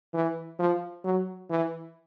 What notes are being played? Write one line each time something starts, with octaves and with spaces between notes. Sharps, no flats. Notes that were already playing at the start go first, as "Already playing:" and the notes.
E3
F3
F#3
E3